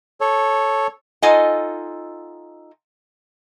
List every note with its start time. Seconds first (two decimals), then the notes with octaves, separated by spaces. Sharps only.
0.21 A4 C#5
1.22 D#4 F4 A4 D#5 F#5 G#5